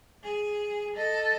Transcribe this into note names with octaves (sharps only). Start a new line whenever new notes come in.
G#4
A4 D#5